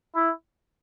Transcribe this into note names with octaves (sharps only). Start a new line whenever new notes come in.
E4